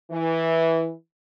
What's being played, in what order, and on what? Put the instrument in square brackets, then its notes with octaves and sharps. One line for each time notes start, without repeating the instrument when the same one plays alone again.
[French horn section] E3